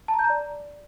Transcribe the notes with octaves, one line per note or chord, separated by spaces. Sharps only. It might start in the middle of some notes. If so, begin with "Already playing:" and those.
A5
A#5
G6
A#5
D5